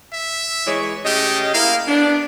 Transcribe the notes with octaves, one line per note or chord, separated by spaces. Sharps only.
E5
E3 G#3 C#5
C#3 A3 G4 D#5
A#3 E4 F5
B3 D4